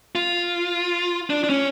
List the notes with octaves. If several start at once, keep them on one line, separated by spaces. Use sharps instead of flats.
F4
D4
D4
C#4